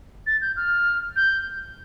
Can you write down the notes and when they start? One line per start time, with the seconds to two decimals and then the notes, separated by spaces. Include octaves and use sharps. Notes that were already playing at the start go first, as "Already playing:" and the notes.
0.27 A6
0.41 G6
0.56 F6
1.16 G6